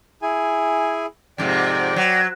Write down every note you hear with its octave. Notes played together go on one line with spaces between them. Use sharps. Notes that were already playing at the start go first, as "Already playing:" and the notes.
E4 G#4 G#5
F2 G#2 C3 D5 G5
F#3